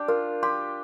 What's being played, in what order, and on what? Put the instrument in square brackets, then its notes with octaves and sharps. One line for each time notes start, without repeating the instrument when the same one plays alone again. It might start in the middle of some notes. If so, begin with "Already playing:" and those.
Already playing: [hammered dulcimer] D4 G4
[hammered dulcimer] F4 [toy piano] A#4
[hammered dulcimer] G4 [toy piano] C6